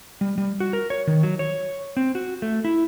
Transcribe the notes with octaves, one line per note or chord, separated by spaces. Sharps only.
G3
G3
F#4
A#4
C#5
D#3
F#3
C#5
C4
F#4
A3
E4